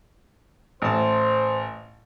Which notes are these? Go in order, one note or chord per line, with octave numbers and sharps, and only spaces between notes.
A1 C5 A5